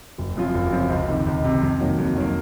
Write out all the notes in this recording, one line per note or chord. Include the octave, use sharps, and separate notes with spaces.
F#1
F#2 F3 C4 F4
F#1
F#2 F3 C4 F4
C#2
C3 D#3
C#2
C3 D#3
F2
D#3 F#3 A#3
F2
D#3 F#3 A#3